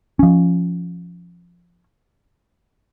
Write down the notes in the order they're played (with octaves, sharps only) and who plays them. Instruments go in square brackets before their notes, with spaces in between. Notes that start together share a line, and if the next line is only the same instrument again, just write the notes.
[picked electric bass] F3 C#4